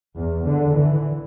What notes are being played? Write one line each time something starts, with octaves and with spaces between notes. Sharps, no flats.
E2
D3
E3